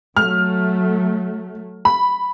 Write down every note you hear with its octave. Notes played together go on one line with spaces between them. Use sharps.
F#3 A3 F6
B5